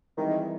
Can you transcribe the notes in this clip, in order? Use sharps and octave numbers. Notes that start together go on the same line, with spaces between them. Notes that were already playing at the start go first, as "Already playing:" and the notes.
D#3 E3 G3 C4 E4 G#4